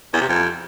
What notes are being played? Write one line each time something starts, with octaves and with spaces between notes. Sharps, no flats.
E2
C3
F2